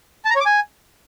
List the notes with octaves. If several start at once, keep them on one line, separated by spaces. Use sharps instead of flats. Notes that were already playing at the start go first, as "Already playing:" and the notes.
A5
A#5
C#5
D6
G#5